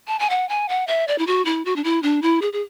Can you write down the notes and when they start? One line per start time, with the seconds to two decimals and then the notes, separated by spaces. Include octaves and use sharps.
0.07 A5
0.19 G#5
0.30 F#5
0.49 G#5
0.69 F#5
0.87 E5
1.08 D5
1.18 E4
1.27 F#4
1.45 E4
1.65 F#4
1.76 D4
1.84 E4
2.03 D4
2.22 E4
2.42 G#4
2.53 G#4